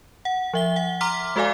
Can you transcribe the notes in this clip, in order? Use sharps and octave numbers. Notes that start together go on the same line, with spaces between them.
F#5
F3 E5 G7
F#5
A#5 C6 D6 F6 B6
G#3 F#4 A4 D5 F5 G#5